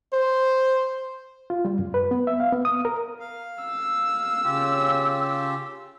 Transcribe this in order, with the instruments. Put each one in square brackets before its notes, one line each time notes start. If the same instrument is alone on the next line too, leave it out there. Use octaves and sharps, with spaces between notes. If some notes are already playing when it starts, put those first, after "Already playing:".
[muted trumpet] C5
[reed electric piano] F4
G3
F#2
B4
B3
E5
F5
B3
D#6
A#4
[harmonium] F5
[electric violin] E6
[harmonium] C#3 F4 G4